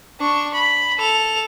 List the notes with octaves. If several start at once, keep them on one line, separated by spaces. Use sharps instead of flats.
D4 C#6
B5
A4 F7